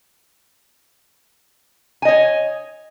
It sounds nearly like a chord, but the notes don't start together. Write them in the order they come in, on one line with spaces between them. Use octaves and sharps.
G#5 D#5 C#5